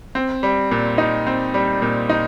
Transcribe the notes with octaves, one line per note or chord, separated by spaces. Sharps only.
C4
G3
A#2
D#4
C4
G3
A#2
D#4